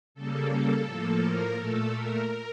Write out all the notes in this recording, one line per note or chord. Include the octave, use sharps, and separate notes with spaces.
C#3 G3 A#3 A4
A4
A2 F3 A#3
A#4
A#2 A3 A4
A#4